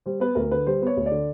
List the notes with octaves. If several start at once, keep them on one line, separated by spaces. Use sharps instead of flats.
G3 C5
B3 B4
D2 A#4
D3 B4
G3 C5
B3 C#5
D2
D5
D3